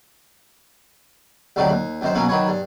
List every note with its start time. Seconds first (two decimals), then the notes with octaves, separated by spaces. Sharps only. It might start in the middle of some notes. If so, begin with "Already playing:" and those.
1.56 A1 D2 D#3 F#3 G3
1.70 D#2
2.01 F#2 D#3 C5
2.15 B2 F#3 A#3 C#4
2.29 D#3 F#3 B4 C#5
2.48 G2